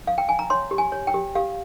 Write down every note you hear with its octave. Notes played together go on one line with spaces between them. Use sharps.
F5
G5
G#5
A#5
C#5 C6
G4
G#5
C#5
G5
G4
G4 F5